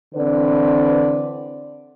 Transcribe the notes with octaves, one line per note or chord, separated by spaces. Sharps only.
D3 E3 C4 B4 D5